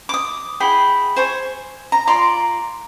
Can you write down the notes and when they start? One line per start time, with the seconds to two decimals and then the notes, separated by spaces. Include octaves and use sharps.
0.09 D6 D#6
0.60 E4 G#4 F#5 G5
1.16 C5 G#5 C#6
1.92 A#5
2.07 F4 D5 A#5 C6